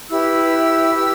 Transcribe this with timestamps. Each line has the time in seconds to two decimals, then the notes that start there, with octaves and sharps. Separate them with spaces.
0.10 E4 G4 B4 E6
0.94 E4 G4 B4